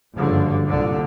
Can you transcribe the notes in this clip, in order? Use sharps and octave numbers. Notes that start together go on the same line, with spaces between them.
F#1 G2 D3 F3
C2 A#2 D3